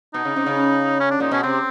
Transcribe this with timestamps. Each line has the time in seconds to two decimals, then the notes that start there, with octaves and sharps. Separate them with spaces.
0.14 B2 D#4
0.25 C#3
0.36 C3
0.46 C#3
1.00 C#4
1.11 D4
1.20 A#2 D#4
1.31 B2 C#4
1.43 C3 C4